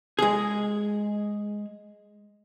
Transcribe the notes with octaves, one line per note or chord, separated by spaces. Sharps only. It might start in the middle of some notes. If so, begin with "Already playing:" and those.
G#3 G#4